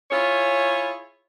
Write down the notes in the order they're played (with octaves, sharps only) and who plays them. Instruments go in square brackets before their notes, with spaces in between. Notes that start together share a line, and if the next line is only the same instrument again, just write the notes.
[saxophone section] E4 F4 G#4 C#5